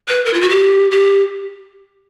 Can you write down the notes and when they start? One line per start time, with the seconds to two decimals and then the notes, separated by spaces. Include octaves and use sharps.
0.08 B4
0.25 A#4
0.33 F4
0.41 F#4
0.49 G4
0.91 G4